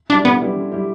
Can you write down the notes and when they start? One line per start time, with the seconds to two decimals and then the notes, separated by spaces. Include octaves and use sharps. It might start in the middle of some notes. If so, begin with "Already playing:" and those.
0.09 G3 D4 E4 G4
0.25 D3 B3
0.40 G3 E4 G4
0.56 D3
0.72 G3 E4 G4